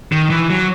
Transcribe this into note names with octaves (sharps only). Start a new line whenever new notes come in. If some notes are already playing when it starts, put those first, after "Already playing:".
D#3
E3
F#3